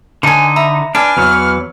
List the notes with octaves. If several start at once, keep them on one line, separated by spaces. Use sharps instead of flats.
D3 D#4 C5 G#5
E5 A#5 B5
D4 B4 G#5 F6
E2 E3 F#3